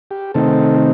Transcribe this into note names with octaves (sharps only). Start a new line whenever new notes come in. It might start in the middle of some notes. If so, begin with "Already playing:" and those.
G4
C3 D#3 A3 C4 D#4 A4